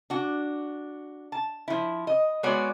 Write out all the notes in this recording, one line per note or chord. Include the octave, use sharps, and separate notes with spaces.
D4 F#4
A5
F3 E4
D#5
G#3 B3 F#4 C#5 D5